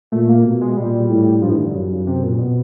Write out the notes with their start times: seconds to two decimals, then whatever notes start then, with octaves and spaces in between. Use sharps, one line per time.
0.12 A#2 A3
0.29 A#3
0.45 B2
0.61 G#3
0.77 A#2 G3
1.10 A2
1.42 G2 F3
1.50 E3
1.58 D#3
1.66 D3
1.74 F#2 C#3
2.07 C3
2.23 A#2
2.39 B2